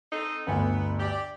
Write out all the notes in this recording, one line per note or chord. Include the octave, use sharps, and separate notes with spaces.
C4 D#4 A4
G1 D2 B3
G4 D5